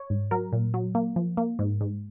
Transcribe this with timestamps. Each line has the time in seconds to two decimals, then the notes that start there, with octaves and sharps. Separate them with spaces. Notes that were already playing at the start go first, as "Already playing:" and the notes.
Already playing: C#5
0.10 G#2
0.31 F#3 A#4
0.53 A#2
0.74 F#3
0.95 A#3
1.16 F3
1.37 A#3
1.59 G#2
1.81 G#2